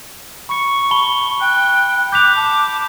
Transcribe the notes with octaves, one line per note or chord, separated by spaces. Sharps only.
B5 C#6 C#7
A5 B5 G7
G5 F#6
D6 F#6 G6 B6 F7
A5